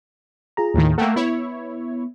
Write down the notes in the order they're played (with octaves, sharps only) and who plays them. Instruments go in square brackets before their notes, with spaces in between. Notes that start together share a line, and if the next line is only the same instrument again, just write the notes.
[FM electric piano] F4 G#4 A#5
[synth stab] D#2 A2 D#3
[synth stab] A3 A#3 [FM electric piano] F#5 G5 E6
[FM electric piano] B3 [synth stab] E4 C#5